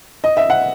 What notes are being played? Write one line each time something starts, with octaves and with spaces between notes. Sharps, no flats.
D#5
E5
F#5